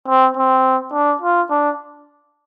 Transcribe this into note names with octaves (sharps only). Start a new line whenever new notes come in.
C4
C4
D4
F4
D4